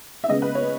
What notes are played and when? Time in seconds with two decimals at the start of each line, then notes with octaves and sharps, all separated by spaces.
0.24 E5
0.29 C#3 G#3 B3 D#5
0.42 B4
0.55 C#5